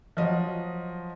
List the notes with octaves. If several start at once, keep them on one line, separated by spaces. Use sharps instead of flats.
F3 F#3 D#5